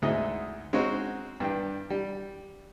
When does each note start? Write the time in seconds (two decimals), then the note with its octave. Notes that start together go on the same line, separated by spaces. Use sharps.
0.02 D2 G#2 E4 G#4 D#5
0.73 G#3 C4 C#4 D#4 F#4
1.40 G2 D4 G5
1.90 G3